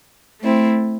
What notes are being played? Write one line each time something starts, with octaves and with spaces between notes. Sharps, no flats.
A3 C4 E4